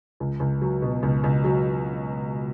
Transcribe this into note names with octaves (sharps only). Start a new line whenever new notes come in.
C#2
C#2
F#3
B2
C#2
C#2
F#3